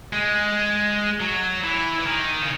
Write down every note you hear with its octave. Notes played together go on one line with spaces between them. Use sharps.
G#3
F#3
E3
E3
D#3
C#3